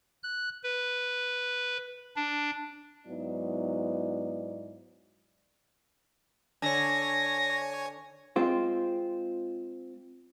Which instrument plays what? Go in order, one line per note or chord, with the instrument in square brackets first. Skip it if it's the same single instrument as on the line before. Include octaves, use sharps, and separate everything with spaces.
[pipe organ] F#6
B4
D4
[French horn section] G#2 F#3 B3 D#4 E4 D5
[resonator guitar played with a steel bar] D3 D4 [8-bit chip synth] C#5 G#5 [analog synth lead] A#6
[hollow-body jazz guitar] G#3 C4 F4